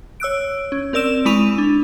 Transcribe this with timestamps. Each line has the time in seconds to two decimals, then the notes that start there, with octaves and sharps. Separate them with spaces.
0.20 C#5 E6 F#6 D7
0.72 C#4
0.93 C4 A#4 D5 E6 E7
1.25 G#3 E4 B5 C#6 D#7 F7
1.58 D4